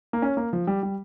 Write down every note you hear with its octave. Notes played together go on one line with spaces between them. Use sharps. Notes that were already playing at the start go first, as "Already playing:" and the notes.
A#3
C#4
A#3
F3
G3
G3